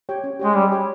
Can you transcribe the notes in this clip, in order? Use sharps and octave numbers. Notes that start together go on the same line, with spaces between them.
G4 C#5 G5
C#4
G#3 G4 C#5 G5
G3 C#4
G4 C#5 G5